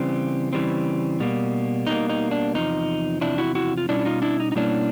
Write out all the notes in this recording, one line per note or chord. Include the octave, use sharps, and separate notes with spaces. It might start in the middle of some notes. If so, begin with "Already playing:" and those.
Already playing: C#3 E3 G3 C4
C#3 E3 G3 C4
B2 G3 A#3
B2 G3 A#3 D#4
D#4
D4
E2 C3 F3 D#4
E2 C3 F3 D4 E4
E4 F#4
E4 F#4
F4
B2 G3 A#3 C#4 D4 E4
E4
D#4 F4
D4 E4
D#4
D#4
B2 G3 A#3 C#4 D4 E4